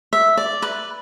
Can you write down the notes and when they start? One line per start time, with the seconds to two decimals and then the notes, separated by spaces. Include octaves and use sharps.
0.13 E5
0.37 D5
0.62 B4